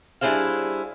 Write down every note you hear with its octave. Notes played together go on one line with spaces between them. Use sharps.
G3 D4 E4 G#4 C5 F5